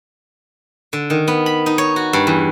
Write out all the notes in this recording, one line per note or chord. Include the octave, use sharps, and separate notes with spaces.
D3
D#3
B3
B5
D#4
C#5
F#4
G2
E2